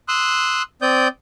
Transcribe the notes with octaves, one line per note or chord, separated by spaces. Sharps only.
C6 D#6 E6 F#6
C4 D5 D#6 G6